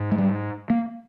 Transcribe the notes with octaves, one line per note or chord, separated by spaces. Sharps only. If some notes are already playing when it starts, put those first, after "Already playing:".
Already playing: G#2
G#3
G3
A#3